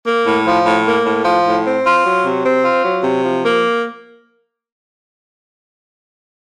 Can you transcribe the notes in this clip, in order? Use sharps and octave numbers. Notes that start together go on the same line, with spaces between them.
A#3
A2
F3
A2
A#3
A2
F3
A2
C4
F4
F#3
C3
C4
F4
F#3
C3
F3
A#3